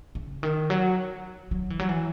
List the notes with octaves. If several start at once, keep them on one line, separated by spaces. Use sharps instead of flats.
C#3
D#3
F#3
F#3
E3
F#3
E3